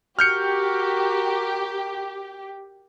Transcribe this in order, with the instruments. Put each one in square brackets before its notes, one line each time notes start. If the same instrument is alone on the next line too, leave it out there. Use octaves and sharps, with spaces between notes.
[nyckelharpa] F#4 A#4 [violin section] G4 [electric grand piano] F6 G6 C#7